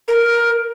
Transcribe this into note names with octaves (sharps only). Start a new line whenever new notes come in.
A#4